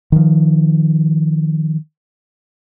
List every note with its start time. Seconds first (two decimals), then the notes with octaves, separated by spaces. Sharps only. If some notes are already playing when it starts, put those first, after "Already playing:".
0.12 D#3 F3